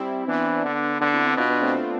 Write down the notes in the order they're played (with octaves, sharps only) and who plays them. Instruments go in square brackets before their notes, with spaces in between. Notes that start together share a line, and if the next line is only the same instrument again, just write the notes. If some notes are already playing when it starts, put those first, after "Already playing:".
Already playing: [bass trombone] G3 [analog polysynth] C4 E4
[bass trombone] E3 [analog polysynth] B3 D4
[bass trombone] D3
[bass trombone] D3 [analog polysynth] B3 D4
[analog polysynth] C4 E4
C4 E4
[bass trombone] B2 [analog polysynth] D4 F4
[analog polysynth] B3 D4
A3 C4